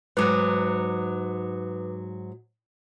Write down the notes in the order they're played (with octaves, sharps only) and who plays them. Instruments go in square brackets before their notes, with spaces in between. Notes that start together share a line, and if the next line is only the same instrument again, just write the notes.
[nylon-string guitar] G#2 F#3 [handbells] B4 D6 D#6